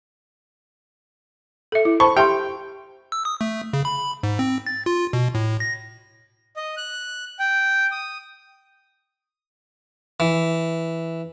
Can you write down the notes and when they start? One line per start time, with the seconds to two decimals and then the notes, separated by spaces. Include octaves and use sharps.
1.72 A4 E5
1.85 E4
2.00 C5 A5 B5 C#6
2.17 G4 E5 G5 C6
3.12 E6
3.25 D#6
3.41 A3
3.73 C#3
3.85 B5
4.23 G#2
4.39 C4
4.66 A6
4.86 F4
5.13 B2
5.35 A2
5.60 A#6
6.56 D#5
6.77 F#6
7.39 G5
7.92 D#6
10.20 E3